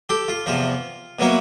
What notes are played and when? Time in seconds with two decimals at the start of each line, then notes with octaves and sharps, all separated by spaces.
0.09 G4 A4
0.28 F4
0.46 E2 C3 F3 F4
1.19 B2 F#3 A#3 C#4 E4